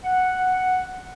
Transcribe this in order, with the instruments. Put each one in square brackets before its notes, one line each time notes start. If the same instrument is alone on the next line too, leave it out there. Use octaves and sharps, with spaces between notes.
[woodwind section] F#5